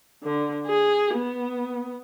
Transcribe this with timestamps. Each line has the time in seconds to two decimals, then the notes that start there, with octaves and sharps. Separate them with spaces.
0.24 D3
0.66 G#4
1.15 B3